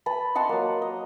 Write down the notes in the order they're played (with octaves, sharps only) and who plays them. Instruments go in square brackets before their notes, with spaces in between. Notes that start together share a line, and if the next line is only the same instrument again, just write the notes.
[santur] B4 A5 B5
D#5 F#5 A5 C6
F#3 A#3
D#5